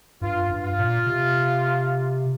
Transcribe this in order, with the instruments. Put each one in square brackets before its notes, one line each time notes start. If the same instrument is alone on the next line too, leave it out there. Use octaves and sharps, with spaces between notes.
[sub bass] G2 [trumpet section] F4
[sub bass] G2
[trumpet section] F4
[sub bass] A#2
C3